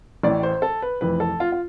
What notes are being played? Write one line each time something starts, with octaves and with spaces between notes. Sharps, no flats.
A1 A2 E3 D5
C5
A4
B4
F1 F2 E3 B4
A4
F4
F4